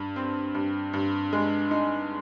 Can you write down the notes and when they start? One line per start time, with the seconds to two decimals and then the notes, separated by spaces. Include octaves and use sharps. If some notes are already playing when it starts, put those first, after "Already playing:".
Already playing: G2
0.16 C4
0.55 G2
0.93 G2
1.33 G#3
1.71 D#4